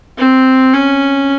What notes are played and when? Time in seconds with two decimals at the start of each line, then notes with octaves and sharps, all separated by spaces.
0.18 C4
0.73 C#4